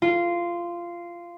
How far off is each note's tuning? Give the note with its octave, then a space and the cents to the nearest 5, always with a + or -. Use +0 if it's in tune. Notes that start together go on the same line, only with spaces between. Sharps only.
F4 -15